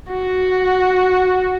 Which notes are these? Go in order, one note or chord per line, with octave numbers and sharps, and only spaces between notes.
F#4